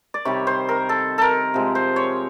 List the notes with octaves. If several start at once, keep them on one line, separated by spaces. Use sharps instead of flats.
D5
C3 D#3 G3 C#5
C5
A#4
A4
A4 A#4
C3 F3 G#3
C5
C#5